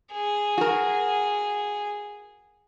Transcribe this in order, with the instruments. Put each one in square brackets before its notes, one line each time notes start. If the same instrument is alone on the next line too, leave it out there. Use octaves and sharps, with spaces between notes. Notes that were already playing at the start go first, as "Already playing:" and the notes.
[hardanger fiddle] G#4
[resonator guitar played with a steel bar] F#4 A#4